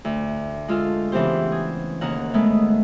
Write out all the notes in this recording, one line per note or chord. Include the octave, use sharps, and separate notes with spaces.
D2
G#3 F4 A4 F6
C#3 E3 B3 C4 G4 C5
G#4
D#2 C#3 A#4 F#5
D#3 G#3 A3 B3